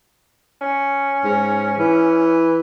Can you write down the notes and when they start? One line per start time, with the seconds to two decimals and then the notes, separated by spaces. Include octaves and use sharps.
0.61 C#4
1.25 G#2
1.78 E3